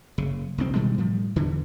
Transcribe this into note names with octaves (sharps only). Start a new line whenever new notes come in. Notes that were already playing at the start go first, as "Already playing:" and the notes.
F#1 C#3
F1 B1 C4
B2 D#3 G3 G#3
A2 F3 G3
E2 G2 D3 E3